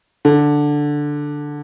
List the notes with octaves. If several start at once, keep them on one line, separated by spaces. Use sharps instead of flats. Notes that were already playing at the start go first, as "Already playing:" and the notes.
D3